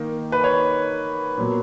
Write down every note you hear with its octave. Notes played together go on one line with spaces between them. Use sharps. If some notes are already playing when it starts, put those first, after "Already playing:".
Already playing: D#3 A#3 D#4
B4
C#5
A#2 F#3 B3